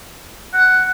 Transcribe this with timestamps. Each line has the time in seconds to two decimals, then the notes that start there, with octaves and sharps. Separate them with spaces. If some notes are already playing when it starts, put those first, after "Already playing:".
0.54 F#5